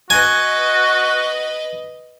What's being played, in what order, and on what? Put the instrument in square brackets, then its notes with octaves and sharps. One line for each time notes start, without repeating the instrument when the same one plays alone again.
[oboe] F#4 [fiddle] B4 D#5 [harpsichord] G#5